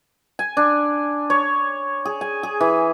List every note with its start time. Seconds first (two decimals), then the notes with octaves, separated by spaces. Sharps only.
0.39 G#5
0.57 D4
1.30 C#5
2.05 G#4
2.21 G#5
2.43 G#4
2.61 E3